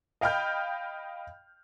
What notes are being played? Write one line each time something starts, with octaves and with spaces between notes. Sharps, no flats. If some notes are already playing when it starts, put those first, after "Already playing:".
D#5 F5 G5 B5 F6 G6